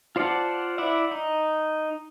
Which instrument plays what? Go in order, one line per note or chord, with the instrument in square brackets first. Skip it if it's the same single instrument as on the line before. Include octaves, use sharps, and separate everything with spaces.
[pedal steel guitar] F4 C5 D5 F#5 A5
E4 D5 E5 F#5
D#4